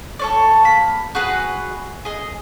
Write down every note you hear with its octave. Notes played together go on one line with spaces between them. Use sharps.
A4 C#5 D5
A#3 B5
F#4 G#4 B4 F#5
G#4 D#5